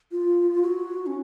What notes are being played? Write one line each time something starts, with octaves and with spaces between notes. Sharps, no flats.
F4
F#4
C#4